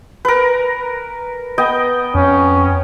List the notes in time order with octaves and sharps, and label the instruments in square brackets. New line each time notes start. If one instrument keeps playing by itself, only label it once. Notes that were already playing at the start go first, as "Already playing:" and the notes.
[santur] A#4 B4
B3 D#5 G5
[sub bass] F2 [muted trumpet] C#4